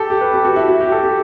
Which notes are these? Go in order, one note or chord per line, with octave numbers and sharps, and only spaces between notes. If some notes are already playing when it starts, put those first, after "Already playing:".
Already playing: G4 A4
G4
B4
G4
F#4
E4
F#4
G4
A4
G4